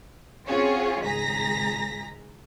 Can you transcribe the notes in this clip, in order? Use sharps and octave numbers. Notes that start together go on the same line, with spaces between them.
C4 C#4 F4 F#4 G#4 C#5
G#1 C#2 G#4 A#5 A#6 B6